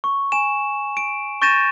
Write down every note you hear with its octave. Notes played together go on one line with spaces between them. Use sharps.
C#6
G#5 E7
D7
C#6 G6 A6 A#6 D#7 E7